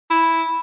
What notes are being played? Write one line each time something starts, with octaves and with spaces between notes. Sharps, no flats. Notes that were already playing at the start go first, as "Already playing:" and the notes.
E4